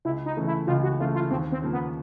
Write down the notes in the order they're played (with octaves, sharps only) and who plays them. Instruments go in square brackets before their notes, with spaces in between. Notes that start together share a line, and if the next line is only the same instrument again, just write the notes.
[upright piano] C#2 [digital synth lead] E4
[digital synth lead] D#4
[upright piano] C#3 E3 A3
[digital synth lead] E4
[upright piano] C#2 [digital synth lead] F4
[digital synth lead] F#4
[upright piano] C#3 E3 A3 [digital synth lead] F4
[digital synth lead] F4
[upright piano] D#2 [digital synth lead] C4
[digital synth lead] C4
[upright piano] C#3 F3 A#3
[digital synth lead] B3